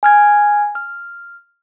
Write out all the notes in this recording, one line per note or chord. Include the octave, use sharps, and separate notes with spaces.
G#5 F6 G#6
F6